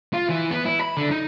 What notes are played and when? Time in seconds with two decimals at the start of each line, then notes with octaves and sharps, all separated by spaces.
0.14 F4
0.29 E3
0.51 B3
0.65 E4
0.81 B5
0.97 D3
1.11 D#4